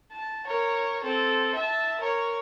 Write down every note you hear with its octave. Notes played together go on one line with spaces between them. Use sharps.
A5
A#4 C#5
C4 A4
E5 A5
A#4 C#5